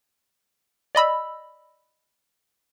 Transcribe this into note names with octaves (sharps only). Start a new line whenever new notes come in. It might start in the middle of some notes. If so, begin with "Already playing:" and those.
D5 D#5 B5 E6